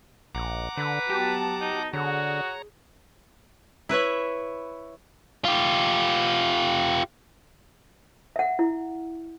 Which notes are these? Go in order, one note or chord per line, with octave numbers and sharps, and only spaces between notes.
A#1 F#5 A#5 D6
D3 B4
F#3 B3 G4 A5
D#4
D3 F#4 G#4 C#5 A#5
E4 B4 C#5 E5
F4 G4
E5 F#5
E4